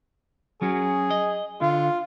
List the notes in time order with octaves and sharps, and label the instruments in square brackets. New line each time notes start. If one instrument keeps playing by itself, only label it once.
[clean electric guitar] F#3 C#4 F#4 [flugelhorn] G#4
[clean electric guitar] D#5
[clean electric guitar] D3 [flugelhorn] F4